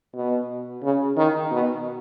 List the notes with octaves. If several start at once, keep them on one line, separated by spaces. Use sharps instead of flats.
B2
C#3
D#3
B2